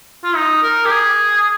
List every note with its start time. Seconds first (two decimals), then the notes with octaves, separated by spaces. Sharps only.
0.24 F4
0.35 D#4
0.63 A#4
0.85 G4
0.91 G#4